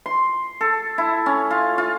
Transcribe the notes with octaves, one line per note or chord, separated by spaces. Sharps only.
C6
A4
E4
C#4
F4
F4